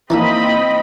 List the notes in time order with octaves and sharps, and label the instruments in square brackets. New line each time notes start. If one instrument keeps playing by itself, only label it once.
[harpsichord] E3 D4 E5 [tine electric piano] A#3 D#4 [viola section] C4 D#5 B5